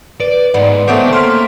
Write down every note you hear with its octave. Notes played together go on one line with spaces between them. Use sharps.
B4 D5
G#2 B3 D5
A3 B3 C#4 A#4 C5 F#5 G5 D6
A#3 C6 F6 B6